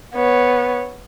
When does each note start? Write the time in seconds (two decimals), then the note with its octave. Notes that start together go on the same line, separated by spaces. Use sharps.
0.15 B3 C#5